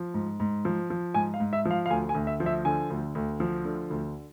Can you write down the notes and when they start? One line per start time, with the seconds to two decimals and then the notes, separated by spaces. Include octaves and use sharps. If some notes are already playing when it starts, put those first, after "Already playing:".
Already playing: F3
0.14 G#2
0.40 G#2
0.65 F3
0.90 F3
1.14 G#2 G#5
1.34 F5
1.40 G#2
1.53 E5
1.65 F3
1.71 F5
1.86 F5
1.90 D2 G#5
2.09 G#5
2.15 D2
2.27 E5
2.40 F3
2.46 E5
2.65 D3 G#5
2.90 D2
3.15 D2
3.40 F3
3.65 D3
3.90 D2